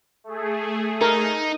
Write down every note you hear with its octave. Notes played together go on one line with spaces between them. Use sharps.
A3 G#4
D#4 A#4